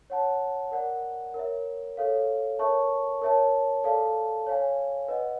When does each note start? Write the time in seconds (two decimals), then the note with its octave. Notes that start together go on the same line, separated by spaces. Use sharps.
0.10 C#5 F#5 A5
0.71 A#4 D5 F#5
1.34 A#4 C#5 E5
1.97 A4 C#5 F5
2.59 A#4 C#5 E5 A5 C#6
3.22 A#4 C#5 E5 A5
3.84 A4 D5 F5 A5
4.47 C#5 F5 G#5
5.08 B4 D#5 F#5